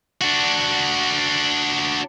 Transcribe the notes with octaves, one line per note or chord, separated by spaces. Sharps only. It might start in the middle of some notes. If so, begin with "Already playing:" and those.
D4 F#4